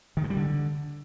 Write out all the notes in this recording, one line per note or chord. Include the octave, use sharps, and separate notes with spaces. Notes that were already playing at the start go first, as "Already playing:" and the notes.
D#3
G2
G3
D3